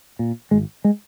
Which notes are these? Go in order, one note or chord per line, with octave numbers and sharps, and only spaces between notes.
A#2
G#1 G#3
G#3